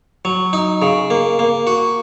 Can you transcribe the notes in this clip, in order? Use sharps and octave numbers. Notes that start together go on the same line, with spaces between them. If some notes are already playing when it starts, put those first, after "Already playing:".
F#3
D#4
C#3
A#3
A#3
F#4